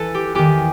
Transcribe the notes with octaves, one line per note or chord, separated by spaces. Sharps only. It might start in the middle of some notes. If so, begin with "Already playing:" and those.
Already playing: E3 A4 B4
G4
E2 D#3 G4